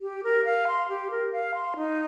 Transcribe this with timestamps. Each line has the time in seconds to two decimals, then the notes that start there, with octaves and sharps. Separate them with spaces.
0.01 G4
0.24 A#4
0.45 F5
0.67 C6
0.89 G4
1.11 A#4
1.32 F5
1.55 C6
1.76 D#4